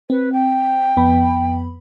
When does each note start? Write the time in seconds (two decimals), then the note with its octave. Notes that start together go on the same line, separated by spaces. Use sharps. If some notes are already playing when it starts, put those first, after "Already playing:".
0.10 C4 B4
0.32 G5
0.97 F2 B3 B5